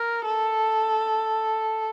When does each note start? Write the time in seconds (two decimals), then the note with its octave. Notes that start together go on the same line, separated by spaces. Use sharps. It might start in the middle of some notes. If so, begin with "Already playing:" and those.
Already playing: A#4
0.25 A4